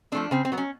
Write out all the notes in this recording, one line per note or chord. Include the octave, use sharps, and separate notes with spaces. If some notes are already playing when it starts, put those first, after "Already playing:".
F3 A3 C4 D4
C#3 C4
C4
F#3 B3
C#4